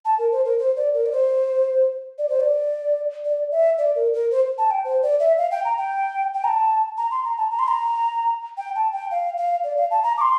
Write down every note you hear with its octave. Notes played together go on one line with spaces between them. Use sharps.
A5
A#4
C5
A#4
C5
D5
A#4
D5
C5
D5
C5
D5
D5
E5
D5
A#4
A#4
C5
A5
G5
C5
D5
E5
F5
G5
A#5
G5
G5
A#5
A5
A#5
C6
A#5
A5
A#5
C6
A#5
G5
A5
G5
F5
F5
D5
F5
A5
A#5
D6
C6